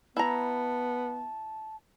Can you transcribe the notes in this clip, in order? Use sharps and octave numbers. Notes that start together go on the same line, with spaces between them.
B3 E4 A5 A#5